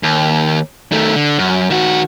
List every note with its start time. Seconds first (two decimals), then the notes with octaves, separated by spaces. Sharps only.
0.03 D#2
0.92 D#3 A3
1.16 D3
1.39 F#2
1.70 D#3 F#4